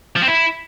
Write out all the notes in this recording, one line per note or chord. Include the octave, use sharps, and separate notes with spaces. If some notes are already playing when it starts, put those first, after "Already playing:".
F3
C4
E4